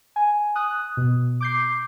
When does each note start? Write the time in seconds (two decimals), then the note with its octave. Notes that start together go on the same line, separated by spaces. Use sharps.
0.16 G#5
0.55 D#6 F#6
0.97 B2
1.41 D6 G6 C7